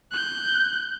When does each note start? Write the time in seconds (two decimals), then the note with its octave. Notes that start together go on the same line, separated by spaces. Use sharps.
0.11 F#6 G6